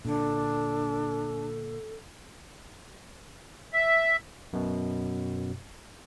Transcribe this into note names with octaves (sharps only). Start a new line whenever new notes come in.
A#2 D3 D4 A4
E5
F#2 B2